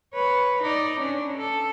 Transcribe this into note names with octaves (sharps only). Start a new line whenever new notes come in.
B4 C#5
D#4 D5
C#4 D4
A4